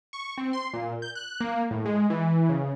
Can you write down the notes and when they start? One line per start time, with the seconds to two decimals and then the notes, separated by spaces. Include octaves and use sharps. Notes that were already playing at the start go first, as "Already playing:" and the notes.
0.13 C#6
0.38 C4
0.53 C6
0.74 A#2
1.02 G6
1.15 F#6
1.41 A#3
1.71 A2
1.86 G#3
2.10 E3
2.49 C#3